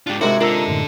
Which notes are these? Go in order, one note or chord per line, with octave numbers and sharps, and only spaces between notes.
G#2 D4 F4 G4
G#2 C3 E4 F#4 A#4
D4 F4 A4 A#4 A#5 E6
F#2 A2 D3